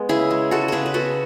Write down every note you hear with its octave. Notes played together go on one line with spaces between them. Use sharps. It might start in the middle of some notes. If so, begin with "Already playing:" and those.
Already playing: G#3 B3
C#3 E4 G#4
G#3
G#3 F#4 A4
C#3 G#4 A4 B4
B4
B3 F#4 A4